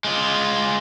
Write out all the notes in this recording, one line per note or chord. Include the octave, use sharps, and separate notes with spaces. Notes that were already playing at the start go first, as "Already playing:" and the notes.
G#3 F4